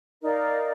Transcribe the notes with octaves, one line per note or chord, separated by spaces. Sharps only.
D#4 A#4 D5 F5